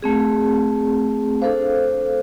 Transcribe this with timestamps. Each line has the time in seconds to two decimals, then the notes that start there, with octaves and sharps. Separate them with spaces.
0.02 A3 C4 G#4
1.42 D4 A4 C5 F5